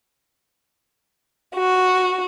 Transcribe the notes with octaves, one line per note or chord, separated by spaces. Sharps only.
F#4